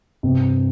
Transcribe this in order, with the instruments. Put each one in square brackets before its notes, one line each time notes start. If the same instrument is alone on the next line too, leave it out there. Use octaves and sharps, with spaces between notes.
[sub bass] G2 [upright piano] C3